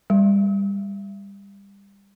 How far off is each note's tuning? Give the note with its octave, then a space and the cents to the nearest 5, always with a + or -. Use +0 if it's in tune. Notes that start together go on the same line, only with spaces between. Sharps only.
G3 +25